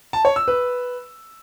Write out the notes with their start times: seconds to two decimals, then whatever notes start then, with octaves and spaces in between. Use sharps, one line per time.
0.13 A5
0.25 C#5
0.36 E6
0.48 B4